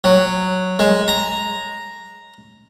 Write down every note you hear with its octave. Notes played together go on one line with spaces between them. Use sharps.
F#3
G#3
A#5